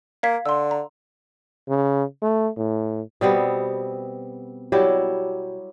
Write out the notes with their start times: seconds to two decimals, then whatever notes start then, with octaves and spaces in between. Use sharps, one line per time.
0.23 A#3 F5 G#6 B6
0.46 D3 C6 E6
0.71 A#5
1.69 C#3
2.22 A3
2.57 A2
3.21 B2 G3 B3 C4
4.72 F#3 G3 E4 G4